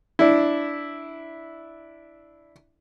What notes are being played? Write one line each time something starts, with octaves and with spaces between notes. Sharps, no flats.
D4 E4